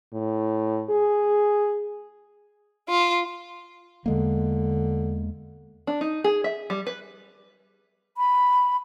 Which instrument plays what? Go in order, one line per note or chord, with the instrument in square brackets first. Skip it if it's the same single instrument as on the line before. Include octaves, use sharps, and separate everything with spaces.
[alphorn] A2
G#4
[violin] F4
[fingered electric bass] E2 G#3 A#3 [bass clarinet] D3
[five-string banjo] D4
D#4
G#4
E5
G3
B4
[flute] B5